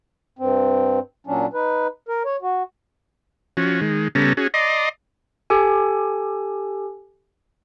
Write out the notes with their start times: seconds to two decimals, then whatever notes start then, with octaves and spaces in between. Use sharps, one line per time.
0.39 G2 C4
1.27 A#2 F#3 C#4 D4
1.53 D#4 B4
2.09 A#4
2.26 C#5
2.42 F#4
3.57 F3 C#4 F#4
3.81 D#3 G#3
4.15 C#3 G3 B3 C#4 A4 A#5
4.37 C#4 F#4 G#4
4.54 D5 D#5 A#5 C6
5.50 G4 A4 G#5